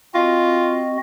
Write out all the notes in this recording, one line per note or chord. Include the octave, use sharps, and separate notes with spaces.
C4 F4 F#4 D#5